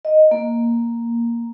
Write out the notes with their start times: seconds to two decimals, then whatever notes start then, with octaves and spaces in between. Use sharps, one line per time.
0.05 D#5
0.31 A#3